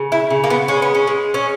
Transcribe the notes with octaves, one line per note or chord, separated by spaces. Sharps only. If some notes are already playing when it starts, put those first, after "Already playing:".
Already playing: C#3
E4
C#3
A#3
B3
G#3 C#4
B3
C#4
G#3
C#4